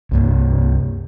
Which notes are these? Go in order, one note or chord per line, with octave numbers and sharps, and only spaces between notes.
C2 G2 A#3